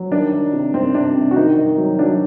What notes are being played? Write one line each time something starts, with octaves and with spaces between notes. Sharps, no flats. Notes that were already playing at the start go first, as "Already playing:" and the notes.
Already playing: F#3
D#3 D4
D#3
C3
D#3 C4
C3 D4
C3
F#4
D#3 D#4
D#3
F#3
F#3 D4